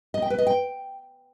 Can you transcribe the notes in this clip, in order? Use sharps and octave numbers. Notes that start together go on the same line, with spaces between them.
D#5
G5
B4
D#5
G5